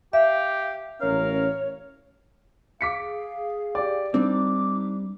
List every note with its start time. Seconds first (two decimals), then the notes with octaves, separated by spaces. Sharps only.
0.13 G4 E5 F5
1.01 A1 C#4 A#4 C#5 F5
2.81 G#4 F5 D6 B6 C#7
3.75 G4 D5
4.14 G3 C4 D4 D#4 D6